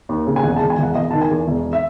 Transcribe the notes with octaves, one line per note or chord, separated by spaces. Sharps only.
D#2
C#3
G#5
E1 F#5
A5
E1
G#5
E1 F#5
E1 D#5
D#3 A5
G#5
E2
E1
E5